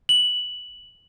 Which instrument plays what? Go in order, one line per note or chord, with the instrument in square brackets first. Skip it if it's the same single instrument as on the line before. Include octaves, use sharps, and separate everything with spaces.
[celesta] F#7